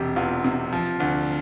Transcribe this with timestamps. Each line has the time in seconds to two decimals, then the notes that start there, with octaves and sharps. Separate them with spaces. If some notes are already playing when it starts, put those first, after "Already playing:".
Already playing: E1 C3 G4
0.16 E2 F4
0.44 C3
0.73 F3
1.00 D2